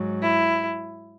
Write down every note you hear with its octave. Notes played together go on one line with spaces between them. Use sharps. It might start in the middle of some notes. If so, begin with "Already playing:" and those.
Already playing: G#2 F#3
E4